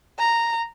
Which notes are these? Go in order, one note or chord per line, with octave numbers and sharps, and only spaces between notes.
A#5